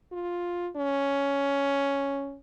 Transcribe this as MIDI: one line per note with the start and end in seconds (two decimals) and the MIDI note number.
0.12 0.69 65
0.76 2.38 61